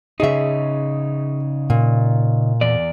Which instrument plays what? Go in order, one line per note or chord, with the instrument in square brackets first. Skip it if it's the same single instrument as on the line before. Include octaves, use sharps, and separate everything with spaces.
[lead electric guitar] C#3 D#4 [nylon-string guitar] G#4 E5
[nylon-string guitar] A#2
[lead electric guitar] E2 D5